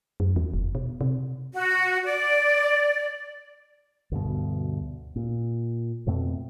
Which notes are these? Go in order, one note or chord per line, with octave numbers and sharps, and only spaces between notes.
F#2
E2
F1
B2
C3
F#4
D5
D2 G2 B2
A#2
F2 B2 A3 C4